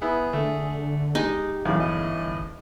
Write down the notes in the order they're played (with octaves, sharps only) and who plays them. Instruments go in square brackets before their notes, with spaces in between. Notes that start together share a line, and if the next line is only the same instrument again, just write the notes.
[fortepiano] B3 E4 [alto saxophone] G#4
[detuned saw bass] D3 [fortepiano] A3
[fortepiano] G#3 [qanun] D#4 [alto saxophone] G4
[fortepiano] E2 A2 C#3 [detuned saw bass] F#3 [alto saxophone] F5
[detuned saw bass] G1 [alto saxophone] D#5